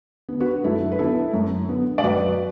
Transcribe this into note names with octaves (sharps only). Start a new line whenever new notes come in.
D3 B3
F#4 B4
F#2 E4 A4
B4
D3 B3 E4 A4
F#2
D3 B3
D5
F#2 F#4 B4